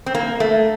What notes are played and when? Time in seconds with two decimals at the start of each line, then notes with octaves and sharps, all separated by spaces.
0.06 C4
0.15 A#3
0.40 A3